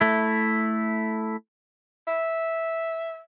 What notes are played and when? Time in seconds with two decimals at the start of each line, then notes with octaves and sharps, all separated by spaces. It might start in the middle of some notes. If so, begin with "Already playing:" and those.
0.01 A3 E4
2.07 E5